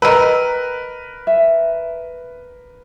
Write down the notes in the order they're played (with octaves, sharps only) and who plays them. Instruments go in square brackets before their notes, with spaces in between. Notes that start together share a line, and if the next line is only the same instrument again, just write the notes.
[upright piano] A#4 B4 [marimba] D#5 E6 [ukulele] G5 A#5 B5
[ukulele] E5